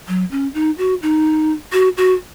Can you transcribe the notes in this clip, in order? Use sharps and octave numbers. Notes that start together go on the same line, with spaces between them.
F#3
C#4
D#4
F#4
D#4
F#4
F#4